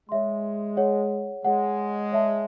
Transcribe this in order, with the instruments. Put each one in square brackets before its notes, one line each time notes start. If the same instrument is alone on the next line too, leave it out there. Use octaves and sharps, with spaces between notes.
[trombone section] G#3 [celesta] C#5 E5 C6
[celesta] G#4 C#5 F#5
[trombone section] G#3 [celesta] G#4 C#5 F#5
[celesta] C#5 E5 A5